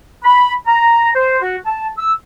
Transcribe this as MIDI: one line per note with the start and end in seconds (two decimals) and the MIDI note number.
0.24 0.54 83
0.66 1.11 82
1.15 1.40 72
1.42 1.58 66
1.66 1.89 81
1.98 2.14 88